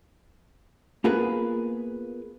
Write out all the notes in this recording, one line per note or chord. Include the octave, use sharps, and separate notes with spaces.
A#3 B3 F4 G#4 A#4 B4